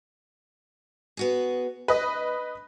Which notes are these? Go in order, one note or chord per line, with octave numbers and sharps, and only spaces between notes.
B3 F#4 G#4
D2 B4 D#5